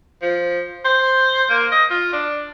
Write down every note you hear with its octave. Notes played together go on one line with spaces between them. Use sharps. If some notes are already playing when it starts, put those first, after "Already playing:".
F3
C5
A#3
D#5
F4
D4